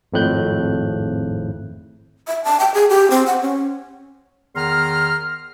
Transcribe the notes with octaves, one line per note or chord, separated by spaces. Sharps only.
G#1 F2 A2 F#6 G6
E5
A5
G5
G#4
G4
C4
F#5
C#4
E2 D#3 A#5 C6 F6